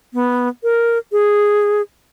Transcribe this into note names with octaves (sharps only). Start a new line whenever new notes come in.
B3
A#4
G#4